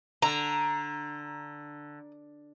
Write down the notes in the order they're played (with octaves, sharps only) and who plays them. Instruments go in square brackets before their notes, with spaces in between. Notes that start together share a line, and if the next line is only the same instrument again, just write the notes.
[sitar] D3 [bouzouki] A#5